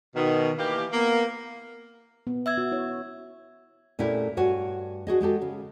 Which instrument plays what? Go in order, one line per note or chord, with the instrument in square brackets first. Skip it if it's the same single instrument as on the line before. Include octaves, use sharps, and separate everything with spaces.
[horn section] B2 D#3
E3 A#3 G4
A#3 B3
[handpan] B3
[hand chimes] E5 E6 G#6
[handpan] F#4
E4 C#5
[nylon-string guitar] A#2 A3 C#4 E4 G4 G#4
G2 F#4 C#5 G#5
D4 F#4 G#4 D#5
G#3 F#4 G4 A4
C#3